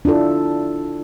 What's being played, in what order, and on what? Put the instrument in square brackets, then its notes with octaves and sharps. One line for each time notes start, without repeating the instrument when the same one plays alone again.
[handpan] D4 E4 F4 A4